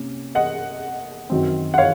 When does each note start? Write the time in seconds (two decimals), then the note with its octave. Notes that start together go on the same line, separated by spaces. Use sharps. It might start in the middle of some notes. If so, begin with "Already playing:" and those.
Already playing: C3 A#3 C#4
0.35 D#5 F#5
1.30 F#2 D#3 F#3 C4
1.74 F#5
1.78 C#5 F5